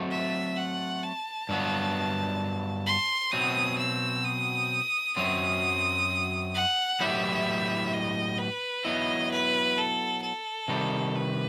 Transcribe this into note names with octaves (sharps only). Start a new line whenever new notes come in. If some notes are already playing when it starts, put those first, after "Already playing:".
Already playing: F#3 A3 C4 F#4 A4
E5
F#5
A5
G2 F#3 B3
C6
B2 F#3 C4 D#6
E6
D#6
F#2 F#3 C4 D#6
F#5
A2 F#3 B3 E4 G4 E5
D#5
B4
F#3 B3 E4 D#5
B4
A4
A4
C3 D#3 G3
B4